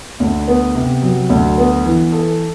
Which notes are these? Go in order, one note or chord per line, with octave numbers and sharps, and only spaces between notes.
D2
B3
C3
F#3
D2
B3
E3
A4